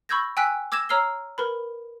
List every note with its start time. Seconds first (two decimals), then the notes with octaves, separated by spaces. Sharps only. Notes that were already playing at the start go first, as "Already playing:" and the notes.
0.09 B5 C#6 E6 G6 G#6 A#6
0.37 G5 G#5 E6 F#6 B6
0.72 D6 E6 G#6 A#6 E7
0.89 C#5 A#5 E6 F6 C7 G7
1.38 A#4 B4 B5